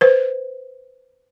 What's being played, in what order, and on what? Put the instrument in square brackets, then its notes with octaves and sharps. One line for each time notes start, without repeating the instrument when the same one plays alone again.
[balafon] B4 C5